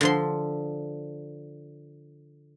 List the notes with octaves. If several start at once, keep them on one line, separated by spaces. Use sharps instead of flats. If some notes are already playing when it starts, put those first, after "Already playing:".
D3 F3 C6